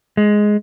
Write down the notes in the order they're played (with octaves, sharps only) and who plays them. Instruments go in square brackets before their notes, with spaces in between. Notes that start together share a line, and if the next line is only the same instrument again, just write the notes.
[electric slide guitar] G#3